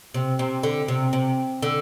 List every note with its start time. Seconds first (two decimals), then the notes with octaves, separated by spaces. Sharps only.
0.14 C3
0.39 C3
0.63 D3
0.88 C3
1.13 C3
1.62 D3